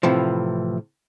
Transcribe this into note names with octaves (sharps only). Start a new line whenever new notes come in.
A2 C3 E3 F3